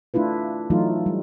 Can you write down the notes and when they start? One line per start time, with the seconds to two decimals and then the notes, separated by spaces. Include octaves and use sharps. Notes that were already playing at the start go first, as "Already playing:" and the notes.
0.14 A3 D4 E4 F4 B4
0.70 E3 F#3 A3 D#4 F4
1.06 G3